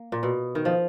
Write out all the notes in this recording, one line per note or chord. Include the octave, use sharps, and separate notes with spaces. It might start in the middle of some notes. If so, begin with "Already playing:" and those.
Already playing: A#3
A#2
B2
D#3
F3